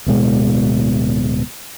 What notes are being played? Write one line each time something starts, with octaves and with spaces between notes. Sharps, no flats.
D1 B2 G#3